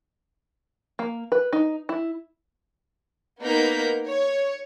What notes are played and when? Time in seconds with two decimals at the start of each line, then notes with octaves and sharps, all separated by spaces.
0.99 A#3
1.32 B4
1.53 D#4
1.89 E4
3.42 A#3 B3 D#4 A#4 G6 B6
4.06 C#5